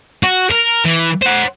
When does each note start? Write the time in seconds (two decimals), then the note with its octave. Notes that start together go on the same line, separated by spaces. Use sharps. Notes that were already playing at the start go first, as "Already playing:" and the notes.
0.23 F#4
0.51 A#4
0.85 E3
1.22 C5 F#5